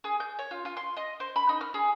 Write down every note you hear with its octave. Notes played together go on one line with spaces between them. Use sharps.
G#4
G6
C#5
F4
F4
C6
D#5
C5
B5
D#4
F6
G#4